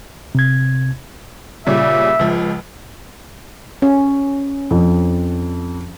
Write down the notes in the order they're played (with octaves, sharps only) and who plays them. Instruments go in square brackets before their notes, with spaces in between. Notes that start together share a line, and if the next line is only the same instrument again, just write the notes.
[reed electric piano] C3 G#6
[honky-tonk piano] A#2 C#3 G3 [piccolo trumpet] E5
[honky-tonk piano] C#2 F3
[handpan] C#4
[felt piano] F2